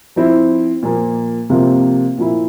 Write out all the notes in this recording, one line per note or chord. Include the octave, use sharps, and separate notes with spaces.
F3 C4 E4
A#2 F3 A#3
C3 F3 A#3 F4
A#2 F3 A#3 E4